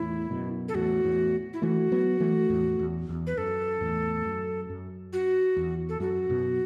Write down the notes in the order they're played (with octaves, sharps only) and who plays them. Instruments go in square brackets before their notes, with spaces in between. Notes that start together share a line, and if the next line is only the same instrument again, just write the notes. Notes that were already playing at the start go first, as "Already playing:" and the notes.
Already playing: [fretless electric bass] E2 A2 [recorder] E4
[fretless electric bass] F#2 B2
[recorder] A4
[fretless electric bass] E2 A2 [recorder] F#4
[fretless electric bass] E2 A2
[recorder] E4
[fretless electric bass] E3 A3 [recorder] F#4
[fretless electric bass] F#3 B3
E3 A3
E2 A2
E2
E2
[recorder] B4
[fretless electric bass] F#2 [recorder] A4
[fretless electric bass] E2 A2
F#2
F#2
[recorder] F#4
[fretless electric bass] E2
[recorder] A4
[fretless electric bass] F#2 [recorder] F#4
[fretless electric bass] F#2 B2